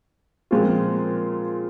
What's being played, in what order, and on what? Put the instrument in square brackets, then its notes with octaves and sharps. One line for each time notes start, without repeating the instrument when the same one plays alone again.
[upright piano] A#2 F3 G#3 C4 F4